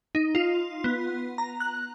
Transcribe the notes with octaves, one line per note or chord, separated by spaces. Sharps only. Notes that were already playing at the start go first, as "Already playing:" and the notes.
D#4
F4
B3
A#5
F#6